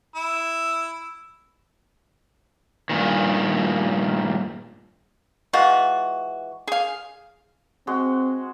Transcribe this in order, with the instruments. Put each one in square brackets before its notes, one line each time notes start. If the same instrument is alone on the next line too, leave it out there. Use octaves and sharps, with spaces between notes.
[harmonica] E4
[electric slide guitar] G2 A#2 D#3
[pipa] E3 G#3 F4 F#4
G#4 F5
[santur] G#3 F#4 C6 [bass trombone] C4